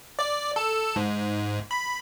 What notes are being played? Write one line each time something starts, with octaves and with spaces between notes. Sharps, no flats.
D5
A4
G#2
B5